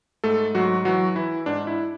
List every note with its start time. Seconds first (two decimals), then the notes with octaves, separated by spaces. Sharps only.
0.24 G#2 A3 A4
0.55 G#2 F#3 F#4
0.85 E3 F#3 F#4
1.16 E3 E4
1.46 G#2 D4
1.67 E4